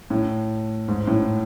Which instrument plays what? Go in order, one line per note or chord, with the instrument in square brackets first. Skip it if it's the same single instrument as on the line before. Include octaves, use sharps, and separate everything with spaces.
[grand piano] A2
G#2
A2